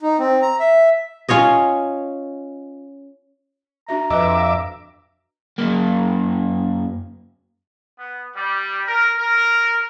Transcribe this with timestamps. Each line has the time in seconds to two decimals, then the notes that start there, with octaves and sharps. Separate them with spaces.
0.02 D#4
0.19 C4
0.42 A#5
0.60 E5
1.29 C#4 F4 C#5 D#5
3.88 D4 F#4 E5 A#5
4.10 F2 B4 D#5 E5 D6
5.59 F#2 A#3
7.99 B3
8.36 G3
8.87 A#4
9.18 A#4